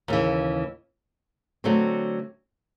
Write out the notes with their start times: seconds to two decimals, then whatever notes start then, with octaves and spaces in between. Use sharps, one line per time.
0.08 D#2 C#3 E3
1.64 D3 F#3 A3 C4